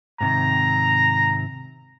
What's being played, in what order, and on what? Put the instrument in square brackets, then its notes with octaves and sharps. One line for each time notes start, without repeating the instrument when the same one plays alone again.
[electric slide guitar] G#2 C3 D#3 [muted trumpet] A#5